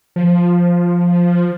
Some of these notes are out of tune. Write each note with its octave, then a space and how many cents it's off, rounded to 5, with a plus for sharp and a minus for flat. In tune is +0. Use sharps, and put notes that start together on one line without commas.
F3 +5